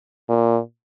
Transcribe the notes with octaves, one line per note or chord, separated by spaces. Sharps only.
A#2